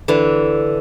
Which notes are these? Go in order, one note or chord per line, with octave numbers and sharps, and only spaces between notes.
D3 E3